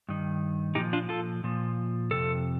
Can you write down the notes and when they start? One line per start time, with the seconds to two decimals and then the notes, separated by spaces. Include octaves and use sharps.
0.09 G2 D#3
0.75 A#2 F3 D#4 G4
0.93 D4 F4
1.09 F4 A4
1.44 A#2 F3
2.11 F2 C3 A4